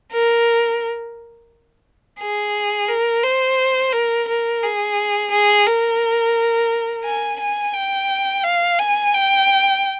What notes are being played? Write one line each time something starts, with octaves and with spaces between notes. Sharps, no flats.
A#4
G#4
A#4
C5
A#4
A#4
G#4
G#4
A#4
G#5
G#5
G5
F5
G#5
G5